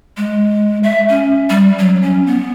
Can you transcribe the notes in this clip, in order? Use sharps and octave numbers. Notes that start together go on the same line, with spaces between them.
G#3
E5
C#4
G3
F#3
C#4
B3